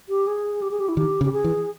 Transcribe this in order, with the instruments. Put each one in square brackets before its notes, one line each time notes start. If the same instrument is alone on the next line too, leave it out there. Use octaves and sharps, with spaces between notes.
[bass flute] G4
G#4
G4
G#4
G4
E4
[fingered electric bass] D#3 [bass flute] G4
[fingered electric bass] C#3
[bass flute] G4
G#4
[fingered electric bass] E3